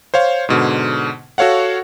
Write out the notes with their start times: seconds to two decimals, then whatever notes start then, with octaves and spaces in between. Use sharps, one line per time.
0.14 C5 C#5 F5
0.49 G#2 B2 D3
1.38 F#4 A4 C#5 F5 F#5